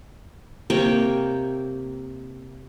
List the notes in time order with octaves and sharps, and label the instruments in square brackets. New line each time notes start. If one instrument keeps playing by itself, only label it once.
[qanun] C3 A#3 C#5 G5